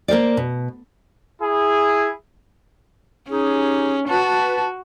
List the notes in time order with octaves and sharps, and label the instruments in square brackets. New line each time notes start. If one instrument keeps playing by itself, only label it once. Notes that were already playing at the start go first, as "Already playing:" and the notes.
[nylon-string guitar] A#3 A#4 C5 D5
B2
[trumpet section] E4 G#4
[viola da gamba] C#4 [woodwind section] D#4 G4 G#4
[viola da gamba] F#4 [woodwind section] B4 A5